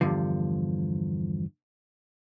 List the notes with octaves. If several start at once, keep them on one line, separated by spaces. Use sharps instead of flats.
E2 G2 D3 F3